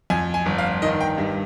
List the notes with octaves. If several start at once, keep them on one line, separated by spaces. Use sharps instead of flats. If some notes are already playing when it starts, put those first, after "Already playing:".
F2 G#5
G#5
G1
F5
D#3 D#5
G5
G2